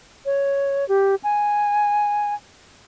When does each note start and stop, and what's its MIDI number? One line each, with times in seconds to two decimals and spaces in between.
0.26 0.87 73
0.88 1.15 67
1.23 2.34 80